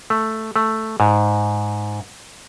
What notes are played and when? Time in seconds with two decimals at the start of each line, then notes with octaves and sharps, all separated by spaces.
0.10 A3
0.56 A3
1.00 G#2